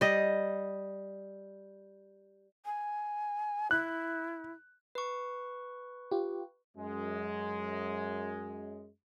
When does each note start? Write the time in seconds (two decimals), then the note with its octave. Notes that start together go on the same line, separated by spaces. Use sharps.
0.01 G3 D#5
2.65 G#5
3.71 E4 F#6
4.95 B4 C#6
6.11 F4 G4
6.76 F#2 G#3